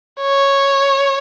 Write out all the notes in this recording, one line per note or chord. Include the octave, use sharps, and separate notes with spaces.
C#5